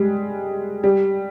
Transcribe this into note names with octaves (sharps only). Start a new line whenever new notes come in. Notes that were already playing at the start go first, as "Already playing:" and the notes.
Already playing: G3 G#3
G3